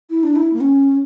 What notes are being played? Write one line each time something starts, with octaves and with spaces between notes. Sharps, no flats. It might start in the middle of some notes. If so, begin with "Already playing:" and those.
E4
D4
E4
A#3
C#4